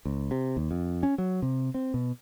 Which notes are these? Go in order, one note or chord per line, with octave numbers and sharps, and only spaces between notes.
C#2
C3
D#2
F2
C#4
F#3
C3
C4
B2